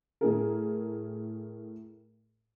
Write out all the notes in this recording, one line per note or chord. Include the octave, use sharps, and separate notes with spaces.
A2 G#4 A#4